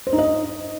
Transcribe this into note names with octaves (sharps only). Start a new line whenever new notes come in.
C5
D#4
D#5